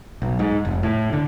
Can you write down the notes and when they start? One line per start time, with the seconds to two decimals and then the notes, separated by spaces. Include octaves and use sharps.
0.22 B1
0.39 G#2
0.65 F1
0.83 A2
1.13 D3